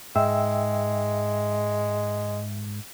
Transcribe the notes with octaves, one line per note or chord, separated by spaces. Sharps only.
G#2 G#3 E5 G5 E6